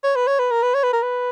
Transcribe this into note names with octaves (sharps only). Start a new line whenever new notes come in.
C#5
B4
C#5
B4
A#4
B4
C#5
B4
A#4
B4